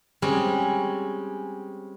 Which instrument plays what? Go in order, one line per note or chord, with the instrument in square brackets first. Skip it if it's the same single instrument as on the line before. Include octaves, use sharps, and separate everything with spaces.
[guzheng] G3 G#3 C4 C#4